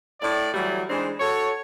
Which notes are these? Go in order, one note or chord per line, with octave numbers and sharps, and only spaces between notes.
A2 D5
E3 F#3 G3 A3
E3 G#3 C4 D4 D#4
F#4 A4 C#5